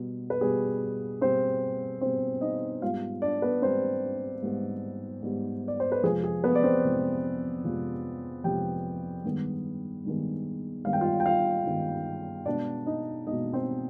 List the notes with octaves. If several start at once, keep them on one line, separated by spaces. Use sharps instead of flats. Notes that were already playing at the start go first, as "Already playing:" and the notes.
Already playing: B2 G3 B3
B4
B2 G3 B3 G#4
B2 G3 B3 C4 C5
B2 G3 B3 C4 C5
D#4 D#5
G#2 G3 B3 F4 F5
D4 D5
B3 B4
G#2 G3 B3 C4 C5
G#2 G3 B3
G#2 G3 B3
D5
C5
B4
F2 C3 F3 G#3 G#4
G#4
B3 B4
D5
C4 C5
F2 C3 F3 G#3
F2 C3 F3 G#3
F2 C3 F3 G#3 G4 G5
G2 D#3 G#3 B3
G2 D#3 G#3 B3
G2 D#3 G#3 B3 F5
G5
F4 F5
G5
F4 F5
G2 D#3 G#3 B3
B2 G#3 B3 D4 D5
D#4 D#5
B2 G#3 B3 D#4 D#5
C4 C5